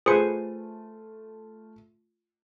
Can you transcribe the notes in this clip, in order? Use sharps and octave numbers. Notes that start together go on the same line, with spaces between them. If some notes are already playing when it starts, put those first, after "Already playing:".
A3 F4 G#4 B4 C5 G#5 C#7